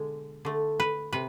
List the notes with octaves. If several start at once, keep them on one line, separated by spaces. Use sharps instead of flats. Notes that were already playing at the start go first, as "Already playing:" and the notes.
Already playing: B2 D3 G#3
D3 A3
B4
C3 B4